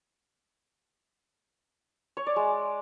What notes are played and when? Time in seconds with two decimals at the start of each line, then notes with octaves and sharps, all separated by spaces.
2.17 C#5
2.27 D5
2.36 G#3